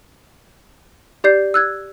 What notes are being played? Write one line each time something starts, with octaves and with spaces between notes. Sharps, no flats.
G4 D5 G6 C7
E6 F#6 G#6